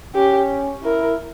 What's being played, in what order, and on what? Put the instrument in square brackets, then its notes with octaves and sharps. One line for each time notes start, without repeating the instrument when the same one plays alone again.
[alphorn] C#4 [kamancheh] G4
[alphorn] E4 [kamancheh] A#4